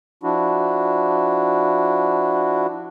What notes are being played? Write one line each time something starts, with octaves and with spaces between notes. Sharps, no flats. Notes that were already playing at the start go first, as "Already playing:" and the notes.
F3 D4 E4 F#4